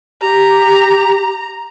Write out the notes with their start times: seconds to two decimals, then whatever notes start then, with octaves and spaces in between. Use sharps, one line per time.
0.22 G4 A#5